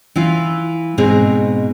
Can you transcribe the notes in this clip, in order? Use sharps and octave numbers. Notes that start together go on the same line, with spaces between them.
E3 E4 F4
G#2 B2 C4 D#4 G#4